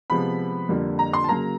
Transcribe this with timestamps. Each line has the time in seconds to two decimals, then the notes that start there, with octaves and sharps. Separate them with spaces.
0.10 C3 F3 G#3 B3 B5
0.69 F2 D3 G3 A#3
0.99 A#5
1.13 C6
1.24 A5
1.29 C#3 F#3 A#3 A#5